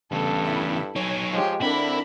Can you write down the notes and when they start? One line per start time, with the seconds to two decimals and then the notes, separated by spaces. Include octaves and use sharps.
0.12 E2 G2 C#3 A4
0.44 E4 B5
0.96 F#3 D#4 C#5 G#5
1.33 F3 G#3 G4
1.62 D3 C4 D4 E4 A#4 B5